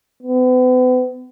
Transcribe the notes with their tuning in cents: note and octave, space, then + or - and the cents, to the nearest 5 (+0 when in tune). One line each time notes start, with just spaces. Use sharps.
B3 +40